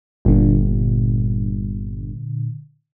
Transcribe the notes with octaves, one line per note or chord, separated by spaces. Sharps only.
G1 A#2 D3